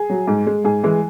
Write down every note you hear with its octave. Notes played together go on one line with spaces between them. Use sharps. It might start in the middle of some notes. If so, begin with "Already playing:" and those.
Already playing: G#4
F#3
G#2
G#3
G#2 G#4
E3 G#3